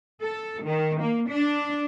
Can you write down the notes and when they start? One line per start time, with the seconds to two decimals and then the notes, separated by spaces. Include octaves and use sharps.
0.22 A4
0.64 D#3
1.01 A#3
1.29 D4